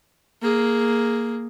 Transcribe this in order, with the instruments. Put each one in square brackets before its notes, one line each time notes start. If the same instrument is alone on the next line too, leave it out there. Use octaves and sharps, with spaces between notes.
[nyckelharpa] A#3 G#4